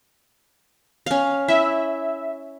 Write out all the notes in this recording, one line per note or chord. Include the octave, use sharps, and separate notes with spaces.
C#4 F5
E4 E5